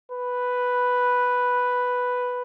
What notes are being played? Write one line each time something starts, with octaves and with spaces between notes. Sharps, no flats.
B4